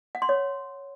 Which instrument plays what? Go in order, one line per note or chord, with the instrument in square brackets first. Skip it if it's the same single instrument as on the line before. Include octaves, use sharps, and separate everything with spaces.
[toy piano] F#5
C6
C#5